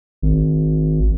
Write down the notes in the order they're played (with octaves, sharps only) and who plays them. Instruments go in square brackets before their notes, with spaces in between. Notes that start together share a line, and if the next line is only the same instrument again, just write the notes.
[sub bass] G#1